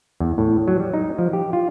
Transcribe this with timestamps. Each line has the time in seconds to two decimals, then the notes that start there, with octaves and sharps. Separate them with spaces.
0.20 E2
0.38 A2
0.68 F#3
0.80 G3
0.94 D#4
1.19 F3
1.33 G4
1.53 F4